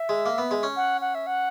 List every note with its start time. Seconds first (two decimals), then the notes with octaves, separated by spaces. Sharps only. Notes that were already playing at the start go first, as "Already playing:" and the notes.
Already playing: E5
0.09 G#3
0.26 A#3
0.38 B3
0.51 G#3
0.63 C#4
0.76 F#5
1.01 F#5
1.15 E5
1.26 F#5